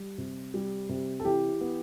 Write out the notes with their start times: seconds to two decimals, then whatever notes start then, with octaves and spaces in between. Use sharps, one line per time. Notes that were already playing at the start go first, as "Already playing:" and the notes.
Already playing: G3
0.18 C3
0.54 G3
0.89 C3
1.20 A4
1.25 E3 G4
1.61 B3